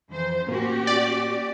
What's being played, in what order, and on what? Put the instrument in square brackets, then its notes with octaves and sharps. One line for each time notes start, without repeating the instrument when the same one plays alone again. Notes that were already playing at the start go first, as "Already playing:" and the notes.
[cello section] F2 E3 C5
[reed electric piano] A2 A#3 [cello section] C#4 F#4 G4
[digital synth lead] D5